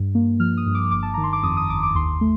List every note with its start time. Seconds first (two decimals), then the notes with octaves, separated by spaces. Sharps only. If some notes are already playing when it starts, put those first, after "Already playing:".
Already playing: G2
0.15 A#3
0.40 F3 F6
0.57 D#6
0.66 G2
0.75 D6
0.91 G1 D6
1.03 A5
1.14 D#3 A#5
1.24 C6
1.33 D6
1.43 F2 D#6
1.57 D#6
1.69 G1 D6
1.83 D6
1.95 D#2 C6
2.21 A3